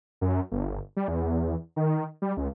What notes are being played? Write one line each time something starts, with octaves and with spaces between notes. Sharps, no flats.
F#2
G1
G3
E2
D#3
G3
C#2